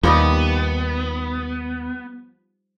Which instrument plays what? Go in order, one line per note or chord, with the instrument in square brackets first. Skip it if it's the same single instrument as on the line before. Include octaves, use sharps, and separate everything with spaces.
[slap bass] D#2 [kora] F3 G3 D#4 [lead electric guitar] B3